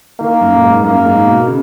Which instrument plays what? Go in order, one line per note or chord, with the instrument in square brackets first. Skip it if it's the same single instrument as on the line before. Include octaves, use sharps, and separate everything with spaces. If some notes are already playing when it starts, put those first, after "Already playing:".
[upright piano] D#3 [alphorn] A#3
[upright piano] F#2
A#2
G#2
[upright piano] F#2 [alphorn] A#3
[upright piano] G#2
B2
C#3